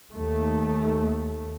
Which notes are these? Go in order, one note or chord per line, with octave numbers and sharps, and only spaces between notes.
D#2 A3